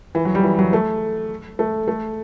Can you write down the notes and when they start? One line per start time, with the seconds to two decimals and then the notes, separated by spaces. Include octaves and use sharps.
0.15 E3
0.25 F#3
0.35 G3
0.43 E3
0.59 F#3
0.73 A3
1.59 A3
1.88 A3